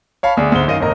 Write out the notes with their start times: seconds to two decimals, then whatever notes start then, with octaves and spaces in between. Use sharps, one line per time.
0.23 C#5 F5 A5 B5
0.37 D2 G#4 D5
0.52 D2 G#2 C5 G7
0.67 F#2 D#3 D#5 F5 D#7
0.80 G1 E2 A2 A#4 D#5 A#5